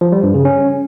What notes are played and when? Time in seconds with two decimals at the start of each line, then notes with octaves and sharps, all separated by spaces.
0.01 F3
0.12 G3
0.23 G2
0.34 C#3
0.45 C#4